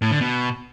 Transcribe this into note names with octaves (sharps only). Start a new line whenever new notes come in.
A2
D3
B2